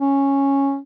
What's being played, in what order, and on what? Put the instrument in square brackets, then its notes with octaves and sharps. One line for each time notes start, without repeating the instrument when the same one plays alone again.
[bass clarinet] C#4